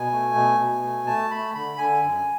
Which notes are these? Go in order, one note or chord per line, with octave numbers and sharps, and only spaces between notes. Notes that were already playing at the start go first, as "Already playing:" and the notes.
Already playing: B2 G#5
A3
B2
B2
A3
A3 A5
A3 B5
D3 B5
D3 G#5
F#2